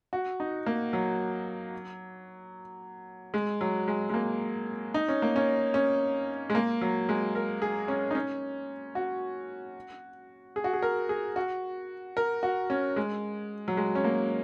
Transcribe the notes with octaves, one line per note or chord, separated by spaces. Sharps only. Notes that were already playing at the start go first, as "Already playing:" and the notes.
F#4
D#4
A#3
F#3
G#3
F#3
G#3
G#3
A#3
D#4
C#4
A#3
C#4
C#4
G#3
A#3
F#3
G#3
A#4
G#4
C#4
D#4
C#4
F#4
G#4
F#4
G#4
A#4
G#4
F#4
A#4
F#4
C#4
G#3
F#3
G#3
C#4
A#3